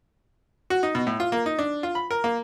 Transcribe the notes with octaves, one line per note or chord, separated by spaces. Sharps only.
F#4
D#4
B2
A2
F4
A#3
D#4
D4
F4
B5
A#4
A#3